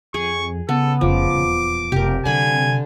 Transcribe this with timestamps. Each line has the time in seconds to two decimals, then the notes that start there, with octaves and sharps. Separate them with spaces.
0.14 F2 G#4 C#6
0.69 C#3 B3 A4
1.01 F1 F3 D6
1.34 D#1 E2
1.92 F1 C3 G4 A#4
2.25 D3 F#3 G#5 B5